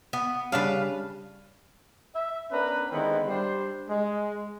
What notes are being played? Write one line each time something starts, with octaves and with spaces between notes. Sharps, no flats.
B3
C#3 G3 D4 B4 F5
E5
B3 C#4 D4 A#4 B4
D3 D#3 G#3 B3 C4 E4
G3 D4 C5
G#3